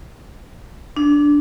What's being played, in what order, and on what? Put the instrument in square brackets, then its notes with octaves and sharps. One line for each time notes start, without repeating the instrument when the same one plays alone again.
[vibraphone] D4